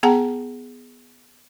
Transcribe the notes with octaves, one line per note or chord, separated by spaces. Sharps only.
B3 G#4 F#5 A5 A#5